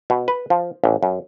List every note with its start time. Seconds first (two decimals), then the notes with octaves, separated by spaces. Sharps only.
0.10 B2
0.28 B4
0.50 F3
0.84 A1
1.03 F#2